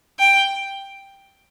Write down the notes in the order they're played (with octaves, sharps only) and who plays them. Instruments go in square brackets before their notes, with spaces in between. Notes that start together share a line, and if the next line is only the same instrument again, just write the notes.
[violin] G5